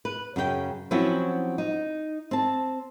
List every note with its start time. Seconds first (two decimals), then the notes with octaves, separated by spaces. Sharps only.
0.05 B4
0.36 F#2 C#3 F#4 G5
0.91 F3 F#3 C4 C#4 E4 F#4
1.58 D#4
2.31 C4 A5